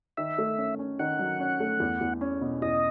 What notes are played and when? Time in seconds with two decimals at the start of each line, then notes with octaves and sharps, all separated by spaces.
0.17 D#3 E5
0.38 A3
0.58 C#4
0.79 C#4
0.99 D#3 F#5
1.19 F#3
1.40 C#4
1.60 A3
1.80 E2
2.01 E2
2.21 C#4
2.41 B2
2.62 E2 D#5